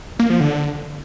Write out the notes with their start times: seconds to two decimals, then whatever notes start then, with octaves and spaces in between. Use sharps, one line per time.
0.19 A#3
0.30 F3
0.40 D3